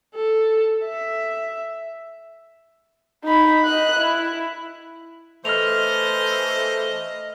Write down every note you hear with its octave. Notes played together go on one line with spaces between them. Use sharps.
A4
E5
D#4 B5
D#5 F#6
E4
E3 A3 C5 D#5 F6 F7